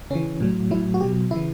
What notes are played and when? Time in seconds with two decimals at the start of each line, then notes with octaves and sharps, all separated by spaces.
0.10 C#3 E3 C#4
0.40 A2 F#3
0.71 A2 F#3 E4
0.94 F#4
1.01 B2 F#3 G4
1.31 C#3 E3 E4